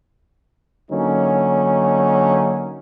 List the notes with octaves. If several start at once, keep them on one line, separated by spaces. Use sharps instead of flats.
D3 F#3 A#3 C#4 D#4